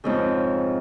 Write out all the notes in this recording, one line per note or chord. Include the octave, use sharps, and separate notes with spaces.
F2 G#2 C#3